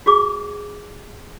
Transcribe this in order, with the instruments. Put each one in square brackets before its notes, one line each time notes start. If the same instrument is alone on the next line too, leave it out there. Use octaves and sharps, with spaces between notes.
[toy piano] F#4 G#4 D6